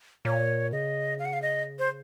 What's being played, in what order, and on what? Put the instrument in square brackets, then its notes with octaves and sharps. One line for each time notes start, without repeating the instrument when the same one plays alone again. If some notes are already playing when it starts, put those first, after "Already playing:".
[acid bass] A#2 [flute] C#5
[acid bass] C#3 [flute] D#5
[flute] F5
F#5
F5
D#5
C5